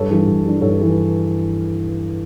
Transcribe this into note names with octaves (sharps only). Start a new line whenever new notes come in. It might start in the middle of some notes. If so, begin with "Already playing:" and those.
Already playing: G2 A4 C#5
E3 G3 D4
G2
E3 G3 D4
G2 A4 C#5
E3 G3 D4